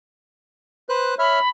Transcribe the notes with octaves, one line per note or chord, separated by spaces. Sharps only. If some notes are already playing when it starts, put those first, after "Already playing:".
B4 C5 F#6
C#5 E5 B5 F6